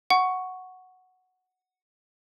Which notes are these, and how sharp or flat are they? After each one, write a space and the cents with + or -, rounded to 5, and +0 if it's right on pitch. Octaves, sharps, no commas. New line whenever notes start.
F#5 +0 C#6 +0